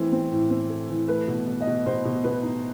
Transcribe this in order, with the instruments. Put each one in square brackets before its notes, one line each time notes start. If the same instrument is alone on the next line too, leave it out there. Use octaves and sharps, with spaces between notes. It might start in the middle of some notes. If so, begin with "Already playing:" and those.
Already playing: [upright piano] E3 A3 C4
C4
A2
C4
A3
E3
A3 B4
B2
B2
D#5
B2
B2 C5
B2
B2 B4
D#4